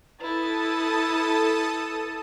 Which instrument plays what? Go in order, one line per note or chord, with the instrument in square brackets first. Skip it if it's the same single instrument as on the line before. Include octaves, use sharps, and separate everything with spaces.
[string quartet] E4 A6 [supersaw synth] A4 A5 D#6 [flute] B4